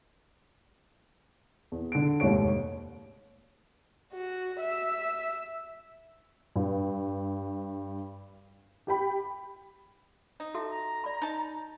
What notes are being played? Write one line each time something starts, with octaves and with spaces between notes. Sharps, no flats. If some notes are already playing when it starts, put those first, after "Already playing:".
E2
D3 D7
F1 D#2 G#2 C#5 D7
F#4
E5
G2
G4 G5 B5
D#4
F#4 A4 E5 A5
A#5
D5 B5
D#4 A5